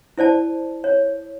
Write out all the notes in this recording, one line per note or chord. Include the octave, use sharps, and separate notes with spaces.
E4 C5 D5 A5
C#5